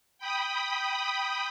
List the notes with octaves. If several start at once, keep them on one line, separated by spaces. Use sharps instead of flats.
G5 B5 D#6